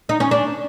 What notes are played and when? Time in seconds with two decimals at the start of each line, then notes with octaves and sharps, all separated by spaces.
0.09 D#4
0.20 C#4
0.31 D4